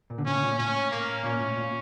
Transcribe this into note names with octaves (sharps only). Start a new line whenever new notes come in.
A#2
D3
A2 C#3 C#4
A#2
A2 C#4
A#3
A#2 C#4
A2
A#2